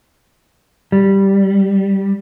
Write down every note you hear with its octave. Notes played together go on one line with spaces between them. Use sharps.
G3